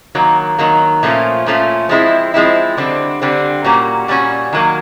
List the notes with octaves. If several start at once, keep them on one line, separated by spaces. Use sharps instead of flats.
D#3 F#3 A#3
D#3 F#3 A#3
A#2 F3 A3 C#4 F4
A#2 F3 A3 C#4 F4
F3 G#3 C4 E4
F3 G#3 C4 E4
D3 G3 C4
D3 G3 C4
A#2 G3 A#3 C#4 F#4
A#2 G3 A#3 C#4 F#4
D#3 F#3 A#3